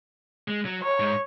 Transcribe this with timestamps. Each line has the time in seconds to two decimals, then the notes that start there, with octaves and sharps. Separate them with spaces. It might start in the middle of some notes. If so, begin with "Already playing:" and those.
0.48 G#3
0.65 F#3
0.83 C#5
1.00 G#2